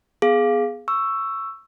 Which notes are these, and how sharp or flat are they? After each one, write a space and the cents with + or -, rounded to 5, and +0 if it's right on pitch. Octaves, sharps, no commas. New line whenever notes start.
B3 +0 G#4 +10 F5 +0
C#6 +0 E6 +10